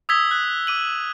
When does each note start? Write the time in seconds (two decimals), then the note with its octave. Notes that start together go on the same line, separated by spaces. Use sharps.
0.09 D#6 E6 G#6 B6 G7
0.31 F#6
0.67 D6 D#7 F#7